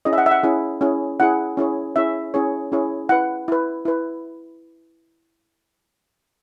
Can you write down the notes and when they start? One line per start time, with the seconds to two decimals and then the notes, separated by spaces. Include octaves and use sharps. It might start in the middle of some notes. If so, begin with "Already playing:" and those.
0.05 C#4 E4 G#4 D#5
0.13 E5
0.18 F#5
0.26 E5
0.31 F#5
0.43 C#4 E4 G#4
0.81 C#4 E4 G#4
1.20 C#4 E4 G#4 F#5
1.57 C#4 E4 G#4 C#5
1.96 C#4 E4 G#4 C#5 E5
2.34 C#4 E4 G#4 C#5
2.72 C#4 E4 G#4 C#5
3.09 E4 B4 F#5
3.48 E4 B4
3.85 E4 B4